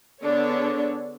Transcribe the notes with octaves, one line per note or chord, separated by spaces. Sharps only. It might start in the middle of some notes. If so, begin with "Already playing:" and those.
D3 B3 D4 G#4 A4 C#5